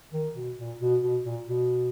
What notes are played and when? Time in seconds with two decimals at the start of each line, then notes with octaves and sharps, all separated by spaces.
0.13 D#3
0.35 B2
0.58 A#2
0.80 B2
1.01 B2
1.24 A#2
1.47 B2